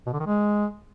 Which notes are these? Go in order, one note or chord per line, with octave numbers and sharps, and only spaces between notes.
B2
D3
D#3
G#3